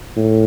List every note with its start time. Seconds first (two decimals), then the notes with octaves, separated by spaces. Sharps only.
0.16 A2